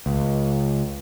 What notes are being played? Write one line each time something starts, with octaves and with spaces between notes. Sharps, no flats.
C#2